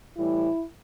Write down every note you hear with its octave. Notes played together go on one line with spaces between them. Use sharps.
A2 E3 G3 E4